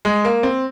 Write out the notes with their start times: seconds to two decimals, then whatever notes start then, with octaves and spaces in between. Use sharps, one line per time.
0.05 G#3
0.25 A#3
0.43 C4